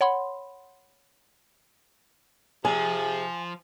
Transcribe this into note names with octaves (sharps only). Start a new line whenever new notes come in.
C#5 F#5 B5 C6
C3 F3 G#4 G#5